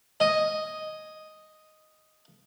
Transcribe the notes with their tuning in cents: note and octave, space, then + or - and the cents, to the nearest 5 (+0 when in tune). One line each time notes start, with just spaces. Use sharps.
D#5 +0 G#5 +0